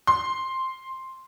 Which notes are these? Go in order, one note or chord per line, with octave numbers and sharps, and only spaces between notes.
C6